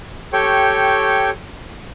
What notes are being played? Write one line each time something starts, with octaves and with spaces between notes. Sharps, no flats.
G4 A4 C#5 G5 C#6